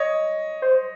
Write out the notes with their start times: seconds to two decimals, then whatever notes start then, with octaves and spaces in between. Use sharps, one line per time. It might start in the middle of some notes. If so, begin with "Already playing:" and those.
Already playing: C#5 D#5
0.62 C5